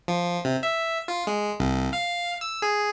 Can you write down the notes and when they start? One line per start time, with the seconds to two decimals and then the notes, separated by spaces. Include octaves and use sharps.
0.08 F3
0.45 C3
0.63 E5
1.08 F4
1.27 G#3
1.60 C2
1.93 F5
2.41 E6
2.62 G#4